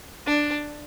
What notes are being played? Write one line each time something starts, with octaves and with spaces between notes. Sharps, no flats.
D4